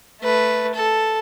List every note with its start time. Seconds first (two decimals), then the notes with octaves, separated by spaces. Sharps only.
0.21 A3 B4
0.75 A4